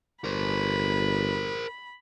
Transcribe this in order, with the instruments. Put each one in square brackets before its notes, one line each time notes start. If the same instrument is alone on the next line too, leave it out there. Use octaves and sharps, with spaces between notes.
[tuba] G1 [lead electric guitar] A#4 C5 [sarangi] B5